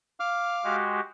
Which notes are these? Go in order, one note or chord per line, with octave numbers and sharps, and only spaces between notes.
F5 D6 F6
G#3 F#4 G4